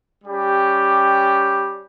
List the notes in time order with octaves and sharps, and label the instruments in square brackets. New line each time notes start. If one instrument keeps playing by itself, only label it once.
[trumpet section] G3 C#4 G4